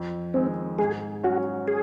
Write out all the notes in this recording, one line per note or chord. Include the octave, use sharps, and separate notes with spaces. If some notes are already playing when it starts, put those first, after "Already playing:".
Already playing: F2
D#3 G#3 C4
G#2 G#4
F#3 C#4 F#4
G#4